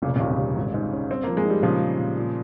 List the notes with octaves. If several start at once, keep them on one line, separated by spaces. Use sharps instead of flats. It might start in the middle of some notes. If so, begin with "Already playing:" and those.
F1 A#2 C#3
A#2 C#3
D#2
A#2 C#3
G3
G#1
G#2
C#4
G2 C4
F3 A#3
G#3
G3 D#4
A#2 C#3 F3
G3
A#2
A#2